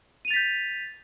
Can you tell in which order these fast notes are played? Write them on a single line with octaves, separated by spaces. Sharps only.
D#7 F7 A6 B6 G6